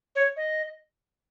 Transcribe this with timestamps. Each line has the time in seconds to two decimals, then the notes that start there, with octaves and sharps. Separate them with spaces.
0.15 C#5
0.36 D#5